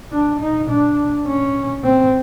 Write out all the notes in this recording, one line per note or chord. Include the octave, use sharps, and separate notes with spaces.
D4
D#4
D4
C#4
C4